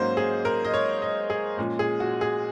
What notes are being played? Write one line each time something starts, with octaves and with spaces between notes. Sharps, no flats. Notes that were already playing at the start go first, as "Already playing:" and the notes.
Already playing: G#2 F#3 A#3 C#4 C5
G#4
A#4
D#5
C#5
D#5
G#4
A#2 F3 G#3 C#4
G#4
F#4
G#4